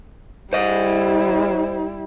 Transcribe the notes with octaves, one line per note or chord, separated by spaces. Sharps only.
G3 E4 C5 D#5